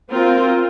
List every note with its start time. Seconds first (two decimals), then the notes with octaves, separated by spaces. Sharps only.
0.11 C4 F4 A#4